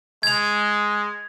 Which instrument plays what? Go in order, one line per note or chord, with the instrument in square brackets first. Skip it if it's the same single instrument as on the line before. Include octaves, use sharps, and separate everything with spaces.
[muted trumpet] G#3 [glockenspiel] G#6 F7